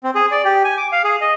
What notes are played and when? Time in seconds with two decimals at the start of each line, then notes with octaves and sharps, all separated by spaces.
0.04 C4
0.15 G#4
0.31 D5
0.45 G4
0.65 G#5
0.77 D6
0.92 F5
1.04 G#4
1.21 D#5